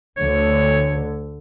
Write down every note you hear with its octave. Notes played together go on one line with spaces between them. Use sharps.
D2 D3 C#5